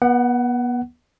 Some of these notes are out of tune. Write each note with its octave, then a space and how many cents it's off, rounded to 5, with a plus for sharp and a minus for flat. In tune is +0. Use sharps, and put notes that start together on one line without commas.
B3 -30 F#5 +20